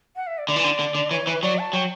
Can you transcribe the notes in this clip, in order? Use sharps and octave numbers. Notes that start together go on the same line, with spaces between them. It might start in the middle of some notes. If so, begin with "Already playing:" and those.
F#5
E5
D5
D3 D5
E3
D3
D3
D3
E3 C#5
E3 B4
F#3 D5
A5
F#3 G5